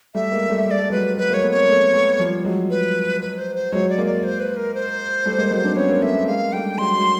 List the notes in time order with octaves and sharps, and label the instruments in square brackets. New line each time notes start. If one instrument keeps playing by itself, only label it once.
[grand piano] G3 A3 [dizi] E5
[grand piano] G#3 A#3
G3 A3
[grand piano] G#3 [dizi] E5
[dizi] D5
[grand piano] A3
[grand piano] F#3 G#3 [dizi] B4
[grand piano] F#3 G#3 [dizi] B4
[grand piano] G#3 A#3 [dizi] C#5
[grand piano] A3 B3
[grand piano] A#3 C4 [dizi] C#5
[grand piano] A3 B3
A3 B3
F3 G3
F#3 G#3
[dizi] B4
B4
C5
C5
[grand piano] F#3 G#3 [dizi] C#5
[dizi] D5
[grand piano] G#3 A#3
[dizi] D5
C5
B4
A#4
C5
[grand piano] G3 A3
G#3 A#3
F#3 G#3
C4 D4
[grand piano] B3 C#4 [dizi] C#5
[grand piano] A#3 C4
[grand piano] A3 B3 [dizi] E5
[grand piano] A3 B3
[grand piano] G#3 A#3 [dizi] F5
[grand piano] G3 A3 [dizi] G5
[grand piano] F#3 G#3 [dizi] C6
[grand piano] F#3 G#3